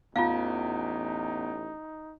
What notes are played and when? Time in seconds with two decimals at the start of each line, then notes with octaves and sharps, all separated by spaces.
0.16 A1 E2 D#4 F4 F5